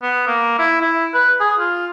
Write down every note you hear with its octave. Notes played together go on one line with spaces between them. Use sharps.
B3
A#3
E4
E4
B4
G#4
F4